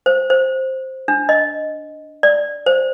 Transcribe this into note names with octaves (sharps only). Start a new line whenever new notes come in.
C5
C5
D4
D#5
D5
C5